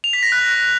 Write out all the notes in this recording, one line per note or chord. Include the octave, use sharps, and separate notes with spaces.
F7
B6
A#6
F#6